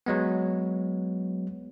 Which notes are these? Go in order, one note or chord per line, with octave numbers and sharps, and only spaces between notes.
F#3 G#3 B3